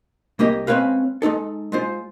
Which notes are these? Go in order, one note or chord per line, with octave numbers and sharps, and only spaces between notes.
C2 A#3 G4 D#5
G#3 C4 C#4 B4 F5
G#3 A3 D#4 A4
G#3 F4 C5